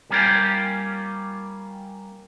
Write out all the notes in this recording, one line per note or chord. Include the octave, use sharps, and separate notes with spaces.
G3 A#3 C#4 F4 G4